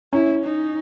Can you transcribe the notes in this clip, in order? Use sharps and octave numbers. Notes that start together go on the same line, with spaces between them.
C#4 E4
D#4